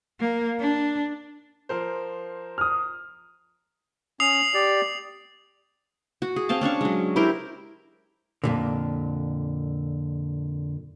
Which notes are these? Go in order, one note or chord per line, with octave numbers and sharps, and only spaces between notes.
A#3
D4
F3 A#4 C5
D#6 F6
C#4 D#6 C7 F7
G4 D5
F#4
G#4
C4 F5 A5
C#4 D4 F5 C#6
F#3 G#3
E4 G4 A#4 C5
F2 A#2 D3